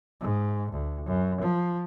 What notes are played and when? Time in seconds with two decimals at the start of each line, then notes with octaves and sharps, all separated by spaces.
0.21 G#2
0.72 D2
1.06 F#2
1.41 F3